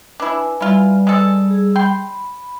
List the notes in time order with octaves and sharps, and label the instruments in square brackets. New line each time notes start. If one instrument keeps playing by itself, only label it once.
[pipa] D4 E4 [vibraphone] B4 G#5
[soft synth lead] G3 [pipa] E4 F4
[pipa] G#3 A4
[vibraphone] G#4 E6
[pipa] G5 C6 [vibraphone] B5